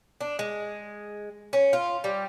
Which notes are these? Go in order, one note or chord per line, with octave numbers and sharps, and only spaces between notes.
D4
G#3
C#4
F4
G3